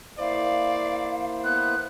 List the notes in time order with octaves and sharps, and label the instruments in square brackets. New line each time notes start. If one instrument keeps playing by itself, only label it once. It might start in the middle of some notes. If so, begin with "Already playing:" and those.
[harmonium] A#3 E4 C5 [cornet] D5 [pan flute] F5
[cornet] B3 [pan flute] F#6